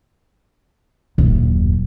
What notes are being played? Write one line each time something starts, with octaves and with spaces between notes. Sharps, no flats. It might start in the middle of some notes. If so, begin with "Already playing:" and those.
D#1 F#2